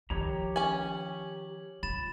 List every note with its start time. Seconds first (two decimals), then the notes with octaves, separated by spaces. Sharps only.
0.10 D#3 F3 G4 C#5 A#5
0.56 C#4 G#5 F#7
1.83 F4 B5 A6 E7